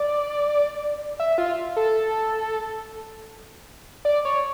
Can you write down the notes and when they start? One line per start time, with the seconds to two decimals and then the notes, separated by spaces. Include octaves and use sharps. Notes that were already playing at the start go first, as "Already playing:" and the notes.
Already playing: D5
1.20 E5
1.38 F4
1.76 A4
4.05 D5
4.25 C#5